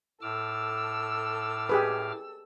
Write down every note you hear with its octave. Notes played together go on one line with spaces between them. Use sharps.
A2 A4 D6 E6 F6
G4 G#4 B4